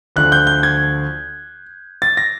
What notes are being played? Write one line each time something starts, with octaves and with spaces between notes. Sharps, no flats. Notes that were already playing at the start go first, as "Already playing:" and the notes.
D2 D3 F3 F#6
G6
G6
G#6
A6
A#6